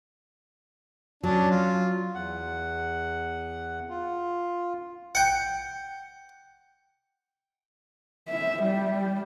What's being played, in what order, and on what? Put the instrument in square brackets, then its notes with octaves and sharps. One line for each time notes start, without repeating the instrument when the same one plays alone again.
[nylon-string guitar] F#3 [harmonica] C#4 D4
[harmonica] F4
[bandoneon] E2 F#5
F4
[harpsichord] F#5 G5
[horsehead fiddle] E5
G3